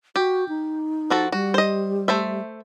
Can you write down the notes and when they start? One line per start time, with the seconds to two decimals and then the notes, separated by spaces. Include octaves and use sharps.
0.16 F#4 G4
0.49 D#4
1.10 F3 F#4 A4
1.32 G3 F#4
1.54 C5 D#5
2.08 A3 C5 E5